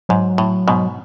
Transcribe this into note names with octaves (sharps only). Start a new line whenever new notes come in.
G#2 F#3
A2
G#2 B2